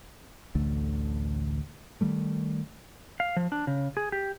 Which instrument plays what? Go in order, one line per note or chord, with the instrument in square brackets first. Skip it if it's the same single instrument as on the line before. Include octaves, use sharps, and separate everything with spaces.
[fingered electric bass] A1 D2 D3 A3
D#3 G3 A3
[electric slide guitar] F5
F3
D4
C#3
G#4
G4